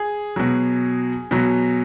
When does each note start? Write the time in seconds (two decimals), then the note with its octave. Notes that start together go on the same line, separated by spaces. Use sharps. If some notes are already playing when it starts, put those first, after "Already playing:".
Already playing: G#4
0.36 B2 F#3
1.31 B2 F#3